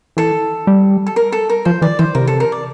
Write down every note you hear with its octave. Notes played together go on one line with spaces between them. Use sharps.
E3 A4
G3
A4
A#4
A4
A#4
F3 C5
E3 D5
E3 C5
C3 A#4
A4
A#4
D5